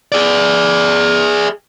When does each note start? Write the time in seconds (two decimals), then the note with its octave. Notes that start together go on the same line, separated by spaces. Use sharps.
0.12 G#4 D5